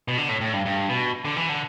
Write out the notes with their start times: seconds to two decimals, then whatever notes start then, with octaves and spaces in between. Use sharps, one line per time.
0.08 B2
0.17 D3
0.29 A2
0.41 A2
0.53 G2
0.65 G2
0.89 B2
1.25 D3
1.37 E3
1.49 D3